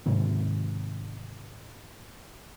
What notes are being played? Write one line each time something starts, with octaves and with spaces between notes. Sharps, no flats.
G#2 C3 D#3